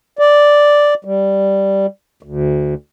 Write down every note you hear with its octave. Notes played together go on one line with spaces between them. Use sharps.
D5
G3
D2